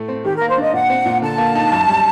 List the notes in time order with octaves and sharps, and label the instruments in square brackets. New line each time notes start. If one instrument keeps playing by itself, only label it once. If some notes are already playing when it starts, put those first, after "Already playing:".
Already playing: [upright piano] A2 A3
C4
[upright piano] D#3 [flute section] G4
[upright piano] A#3 [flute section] A#4
[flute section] C5
[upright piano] D4 [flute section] D#5
[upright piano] A#2 [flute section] F#5
[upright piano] C4
A#2
[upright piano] D3 [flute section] A5
[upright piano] A#3
D#4
F#2
G3